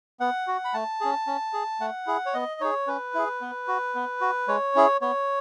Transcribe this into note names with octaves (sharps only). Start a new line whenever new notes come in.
B3 F#5
F#4
B5
A3 A5
C#4 G#4
C#4
G#4
A3 F#5
E4 G#4
C#5
B3 D#5
D#4 G#4 C#5
C#4 B4
E4 G#4
B3
F#4
B3
F#4
G#3 C#5
C#4 E4 G#4
B3 C#5